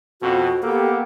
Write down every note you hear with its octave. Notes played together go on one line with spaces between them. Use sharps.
F2 B2 F#4
A#3 B3 G4 A4